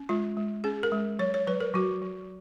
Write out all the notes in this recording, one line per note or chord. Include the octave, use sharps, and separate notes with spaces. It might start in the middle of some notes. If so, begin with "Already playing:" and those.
Already playing: C#4
G#3 F4
G#3
C#4 G#4
A#4
G#3
F#3 C#5
C#5
F#3 B4
A#4
F#3 F#4
F#3